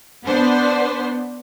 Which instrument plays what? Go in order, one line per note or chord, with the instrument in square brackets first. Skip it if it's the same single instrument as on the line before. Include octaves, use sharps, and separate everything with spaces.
[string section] B3 D4 B4 C5